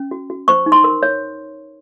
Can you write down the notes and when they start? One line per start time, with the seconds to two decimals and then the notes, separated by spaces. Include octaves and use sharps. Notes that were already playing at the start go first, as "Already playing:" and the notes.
Already playing: C#4
0.11 F#4
0.30 F#4
0.48 C5 C#6
0.66 D#4
0.72 C6
0.84 A#4
1.03 C#5